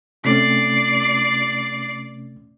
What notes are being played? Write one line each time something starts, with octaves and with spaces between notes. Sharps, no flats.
C3 A3 C#4 D5 C7